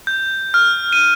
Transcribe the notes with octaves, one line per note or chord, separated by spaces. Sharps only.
G6
F6
D#7